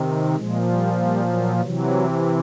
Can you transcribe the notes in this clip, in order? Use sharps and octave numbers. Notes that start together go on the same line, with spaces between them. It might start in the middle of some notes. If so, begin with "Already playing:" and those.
Already playing: C3 D#3
A#2 F3 G#3
G3
G3
F#3
C3 E3 F#3